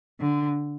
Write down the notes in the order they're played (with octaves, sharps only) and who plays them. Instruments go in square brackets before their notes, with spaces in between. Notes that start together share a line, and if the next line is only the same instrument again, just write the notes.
[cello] D3